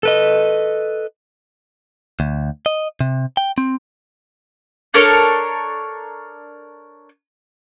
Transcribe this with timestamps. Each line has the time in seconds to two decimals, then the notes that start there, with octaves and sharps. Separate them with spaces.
0.03 A4 B4 D#5
2.20 D2
2.66 D#5
3.01 C3
3.37 G5
3.58 C4
4.94 D4 A4 A#4 C#5